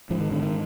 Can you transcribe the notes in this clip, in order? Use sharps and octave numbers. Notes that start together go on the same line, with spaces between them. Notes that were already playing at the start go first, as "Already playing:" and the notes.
G#2 F3
D#3
D3
D#3